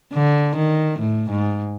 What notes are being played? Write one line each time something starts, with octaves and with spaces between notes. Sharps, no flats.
D3
D#3
A2
G#2